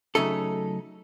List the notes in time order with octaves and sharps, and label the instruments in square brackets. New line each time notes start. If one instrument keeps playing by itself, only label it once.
[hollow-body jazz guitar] C#3 F#3 A3 D#4 A4